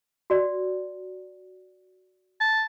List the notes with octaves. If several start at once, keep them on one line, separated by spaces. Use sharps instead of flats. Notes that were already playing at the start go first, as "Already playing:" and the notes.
F#4 D5
A5